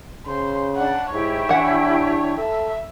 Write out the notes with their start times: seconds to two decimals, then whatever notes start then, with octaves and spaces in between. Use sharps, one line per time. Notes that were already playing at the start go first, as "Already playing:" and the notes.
0.27 C#3 C5
0.76 D4 F#5
1.12 G#2 E4 G4 C#5
1.49 E3 D4 F#5
2.37 A4 E5